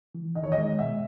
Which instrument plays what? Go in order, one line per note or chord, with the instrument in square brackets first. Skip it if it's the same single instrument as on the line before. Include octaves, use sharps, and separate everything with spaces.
[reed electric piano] E3
[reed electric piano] D#3 [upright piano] D#5
[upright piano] C#5
D#5
[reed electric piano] G#3
[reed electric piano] B2 [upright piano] E5